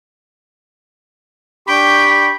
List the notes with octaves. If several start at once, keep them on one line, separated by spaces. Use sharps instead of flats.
D4 G4 G5 B5 C#6 G6